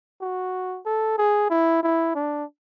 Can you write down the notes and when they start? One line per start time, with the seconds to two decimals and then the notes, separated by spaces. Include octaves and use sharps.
0.22 F#4
0.86 A4
1.18 G#4
1.50 E4
1.83 E4
2.15 D4